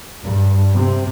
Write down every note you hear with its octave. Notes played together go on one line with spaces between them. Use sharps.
G2
C3